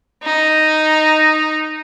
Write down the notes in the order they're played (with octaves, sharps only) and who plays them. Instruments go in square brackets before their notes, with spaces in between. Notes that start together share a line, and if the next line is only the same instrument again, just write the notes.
[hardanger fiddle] D#4